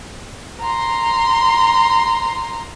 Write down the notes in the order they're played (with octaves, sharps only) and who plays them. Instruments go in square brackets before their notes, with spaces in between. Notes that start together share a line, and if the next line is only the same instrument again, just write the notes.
[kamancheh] A#5 C6